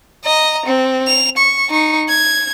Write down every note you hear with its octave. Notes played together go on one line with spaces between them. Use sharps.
D#5 A#5
C4
F7
C#6
D#4 C#6
G#6